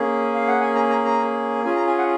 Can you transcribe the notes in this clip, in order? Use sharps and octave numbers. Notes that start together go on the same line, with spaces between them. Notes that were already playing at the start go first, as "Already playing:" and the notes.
Already playing: A#3 C#4 G#4
F5
F#5
G#5
A#5
A#5
A#5
C#4 F4 G#4 G#5
A#5
G#5
F#5